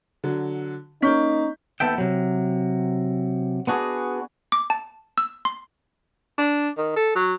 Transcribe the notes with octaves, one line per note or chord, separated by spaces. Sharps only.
D3 F#3
A#3 C#4 D#4 G6 B6
D#2 B3 A4 E5 G5
C3 F#3
B3 D4 F#4 G#4
D6
A5
E6
C6
D4
D#3
A4
F#3